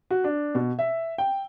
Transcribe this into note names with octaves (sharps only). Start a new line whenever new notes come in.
F#4
D4
B2
E5
G5